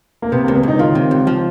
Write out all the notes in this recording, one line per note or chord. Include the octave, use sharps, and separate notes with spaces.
A#3
C3 B3
C#2 A#3
B3
C#2 D#4
D#3 F4
C3
C#2
F3